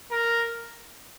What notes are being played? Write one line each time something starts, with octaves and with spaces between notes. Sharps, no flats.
A#4